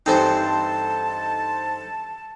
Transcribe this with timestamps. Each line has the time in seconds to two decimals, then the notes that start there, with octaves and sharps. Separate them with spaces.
0.06 G2 E3 C4 D#4 A4 C5 A5